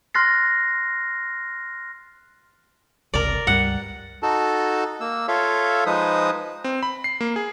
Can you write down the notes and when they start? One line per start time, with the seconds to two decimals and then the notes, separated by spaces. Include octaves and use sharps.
0.14 C6 F6 F#6 A6 A#6 C7
3.14 G1 C#2 C3 A#4 D5
3.47 C#2 G2 G3 F#5
4.23 D#4 F#4 A4 A5
5.00 A#3 E6
5.28 F4 A4 C#5 E5 F5
5.86 F3 G#3 D#4 B4 C5 D#6
6.64 C4
6.83 B5
7.04 C7
7.21 A#3
7.36 G#4